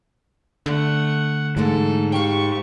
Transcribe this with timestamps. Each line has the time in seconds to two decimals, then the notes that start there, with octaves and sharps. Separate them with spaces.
0.66 D3 A3 F#5
1.57 G#2 E3 G#3 A3 A4
2.12 G4 F5 G5 C#6